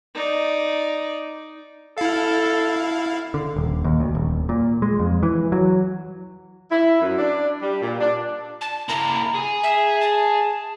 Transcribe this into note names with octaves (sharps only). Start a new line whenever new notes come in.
D#4 D5
E4 A4 F5
D3
D#1
D#2
D2
D#1
A#2
G#3
F2
E3
F#3
E4
F#2
D4
G3
A#2
D4
A5
A#3 E4 A#5
G#4 G#5
E5
A5